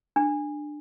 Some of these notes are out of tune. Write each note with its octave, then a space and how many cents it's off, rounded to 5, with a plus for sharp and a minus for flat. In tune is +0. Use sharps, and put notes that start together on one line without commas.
D4 +15